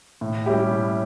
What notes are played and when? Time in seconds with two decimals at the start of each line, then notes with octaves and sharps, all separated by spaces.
0.21 A2
0.46 G3 C#4 E4 G4
0.71 A2